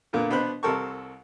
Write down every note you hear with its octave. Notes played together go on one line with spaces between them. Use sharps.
A#2 D3 A#3 B3 A#4
B2 B3 D4 C5 B5 F#6
C2 C3 A4 A#4 A5 C#6